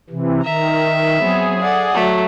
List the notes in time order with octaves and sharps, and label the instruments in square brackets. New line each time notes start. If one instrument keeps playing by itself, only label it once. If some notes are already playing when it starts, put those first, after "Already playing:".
[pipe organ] C3 E3
[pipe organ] D#3 [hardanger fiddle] E5 [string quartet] A#5
[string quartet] F#3 B3 C4 [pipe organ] G#4
[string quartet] A4 D5 F#5
[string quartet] F#3 [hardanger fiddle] A3